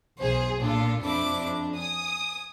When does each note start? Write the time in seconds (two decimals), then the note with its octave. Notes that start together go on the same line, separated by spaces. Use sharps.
0.19 B1 E2 G#4 C5
0.61 A#2 D4 F4 A4
1.01 F2 D4 E4 D6
1.76 G#5 D#6